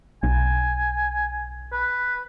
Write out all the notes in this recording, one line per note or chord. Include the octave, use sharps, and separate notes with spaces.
B1 G#5
B4